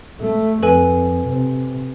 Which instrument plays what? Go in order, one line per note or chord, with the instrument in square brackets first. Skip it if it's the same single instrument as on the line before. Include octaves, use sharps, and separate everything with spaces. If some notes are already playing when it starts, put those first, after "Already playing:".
[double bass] A3
[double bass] F2 [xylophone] A4 B4 G#5
[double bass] C3